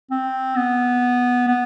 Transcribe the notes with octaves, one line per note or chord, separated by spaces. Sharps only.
C4
B3
B3